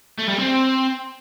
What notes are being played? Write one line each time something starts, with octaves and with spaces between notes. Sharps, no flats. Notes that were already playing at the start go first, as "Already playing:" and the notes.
A3
G3
C4